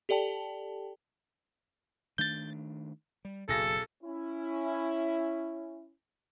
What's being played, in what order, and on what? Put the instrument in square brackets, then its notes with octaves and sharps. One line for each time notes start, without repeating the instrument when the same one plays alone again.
[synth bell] G4 A4 D5 G5 A5
[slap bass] D#3 A3 D4 [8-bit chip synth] G6 A6
[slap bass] G3
[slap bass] F#1 [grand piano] B1 G#4 A#6 [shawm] A4
[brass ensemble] C#4 E4